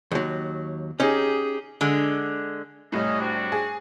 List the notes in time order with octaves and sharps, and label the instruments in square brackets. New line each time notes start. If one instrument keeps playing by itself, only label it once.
[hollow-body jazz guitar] D#2 F#3
[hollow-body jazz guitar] C#4 D#4 [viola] G4 G#4
[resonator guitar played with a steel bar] D3 G#3
[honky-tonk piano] C2 A2 [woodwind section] C#4 D#5
[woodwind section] C4 D4 F#4
[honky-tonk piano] G#4